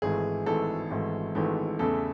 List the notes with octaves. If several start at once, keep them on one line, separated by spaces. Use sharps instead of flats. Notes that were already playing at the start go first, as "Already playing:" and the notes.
G#1 G#2 E3 A3 G#4
G#1 G#2 E3 A3 A4
G#1 G#2 E3 A3
G#1 G#2 E3 A3
E2 C#3 E3 A3 A4